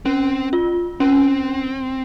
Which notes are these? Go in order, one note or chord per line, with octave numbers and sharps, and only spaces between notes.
C4 C#4
F4
C4 C#4